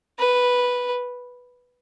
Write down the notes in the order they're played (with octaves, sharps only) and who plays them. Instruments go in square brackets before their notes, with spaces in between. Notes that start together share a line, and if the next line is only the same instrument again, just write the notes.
[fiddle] B4